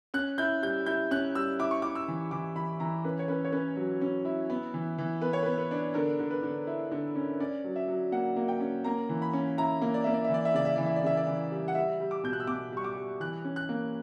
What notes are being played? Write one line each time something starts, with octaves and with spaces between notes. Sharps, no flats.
C#4 F#6
E4 G6
G3 G6
E4 G6
C#4 F#6
G3 E6
E4 D6
C#6
E4 D6
E6
E3
E3 D6
E3 B5
E3 A#5
C#4 B4
C#5
C#4 B4
C#5
C#4 B4
F#3
C#4
E4
B3
E3
E3
B3 B4
C#5
B3 B4
B4
D4
D3 A#4
D3
B4
D3
E4
D3
C#4
C#4 D5
F#3
E5
F#3
A#3 F#5
A#3
G5
C#4
A#3 A#5
E3
B5
C#4
E4 A#5
A#3
D5
A#3 E5
D5
E5
E3 D5
E5
C#3 D5
E5
E3 D5
E5
D5
C#3 E5
D5
E3
G3
F#5
G3 E5
G3
D6
B2 G6
F#6
E6
B2 D6
G3 C#6
D6
G3
E3 F#6
C#4
F#6
A#3